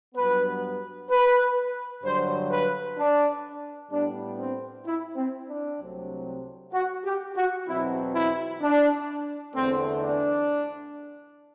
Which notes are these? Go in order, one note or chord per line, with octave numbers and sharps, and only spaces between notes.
G2 F#3 B3 B4
B4
G2 D3 F#3 C5
B4
D4
A2 G3 B3 D4
C4
E4
C4
D4
C2 C3 F#3 A3 C4
F#4
G4
F#4
E2 B2 F#3 C4 E4
E4
D4
E2 D3 A3 C4
D4